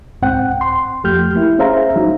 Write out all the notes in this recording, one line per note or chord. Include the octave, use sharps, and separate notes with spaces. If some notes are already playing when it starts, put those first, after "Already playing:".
C2 G#2 C4 F#5 G5
C6
F2 F3 A3 G4 F6 G6
A#3 E4
C#4 G#4 C5 E5 F5 A#5
F#3 D#4